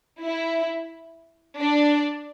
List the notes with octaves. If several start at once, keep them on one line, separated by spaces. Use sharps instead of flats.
E4
D4